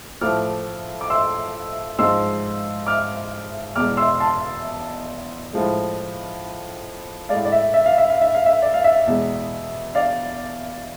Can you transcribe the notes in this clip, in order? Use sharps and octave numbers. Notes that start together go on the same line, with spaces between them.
A2 F3 A3 D6 F6
D6
C6 E6
G#2 F3 G#3 C6 E6
D6 F6
E2 B2 G#3 D6 F6
C6 E6
A5 C6
A2 F3 G#3
G#3 D5 F5
A2
D5
E5
E5
F5
E5
F5
E5
F5
E5
D5
F5
E5
E2 B2 G#3
D5 F5